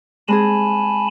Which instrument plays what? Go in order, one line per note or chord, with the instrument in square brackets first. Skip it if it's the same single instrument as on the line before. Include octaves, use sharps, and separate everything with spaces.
[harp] G#3 C4 G#4 [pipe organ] G#5 A5 B5